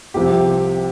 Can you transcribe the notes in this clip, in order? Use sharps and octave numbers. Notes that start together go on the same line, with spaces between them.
C2 C3 F3 G4